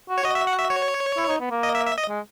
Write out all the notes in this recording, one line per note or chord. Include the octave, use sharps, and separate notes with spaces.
F#4
C#5
F#4 D#5
E5
F#5
E5
C#5
E4
D#4
B3
A#3
D#5
E5
E5
D#5
G#3